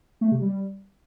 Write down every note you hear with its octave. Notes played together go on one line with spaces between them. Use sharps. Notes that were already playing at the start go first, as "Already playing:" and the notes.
A3
C3
G3